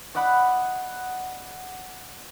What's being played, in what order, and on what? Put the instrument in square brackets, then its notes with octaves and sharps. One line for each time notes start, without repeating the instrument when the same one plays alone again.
[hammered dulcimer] D5 D#5 F#5 B5